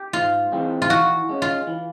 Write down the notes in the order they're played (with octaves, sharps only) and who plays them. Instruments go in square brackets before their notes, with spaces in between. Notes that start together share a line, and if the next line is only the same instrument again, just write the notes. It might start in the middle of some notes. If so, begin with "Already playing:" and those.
Already playing: [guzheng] G4
[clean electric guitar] G#2 [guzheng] F4
[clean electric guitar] E3 G#3 C4
[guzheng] F4
[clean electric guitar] E3 [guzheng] F#4
[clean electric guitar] G#3 C#4
[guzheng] F4
[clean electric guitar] E3